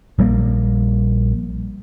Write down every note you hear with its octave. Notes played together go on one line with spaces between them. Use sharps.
A#1 G3 A#3